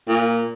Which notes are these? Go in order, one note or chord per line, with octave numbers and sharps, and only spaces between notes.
A#2